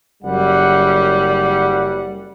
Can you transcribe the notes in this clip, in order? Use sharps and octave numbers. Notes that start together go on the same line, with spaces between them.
F#1 F#2 G3 F#5